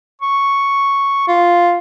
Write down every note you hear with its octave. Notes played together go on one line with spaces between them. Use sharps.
C#6
F4